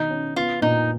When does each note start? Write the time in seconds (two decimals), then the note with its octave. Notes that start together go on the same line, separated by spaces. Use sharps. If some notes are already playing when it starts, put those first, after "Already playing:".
Already playing: B2 D#3 D#4
0.10 C#4
0.36 B3 F4
0.62 A#2 D#4